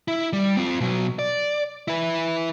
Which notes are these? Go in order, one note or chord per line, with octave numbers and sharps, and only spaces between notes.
E4
G3
C4 F4
B2 F#3
D5
E4 B4